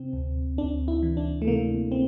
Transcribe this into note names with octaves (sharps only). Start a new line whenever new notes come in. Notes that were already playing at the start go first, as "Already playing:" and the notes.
Already playing: C3 C4
D2
D2 D4
E4
E3
D4
A3
C3 A#3
C4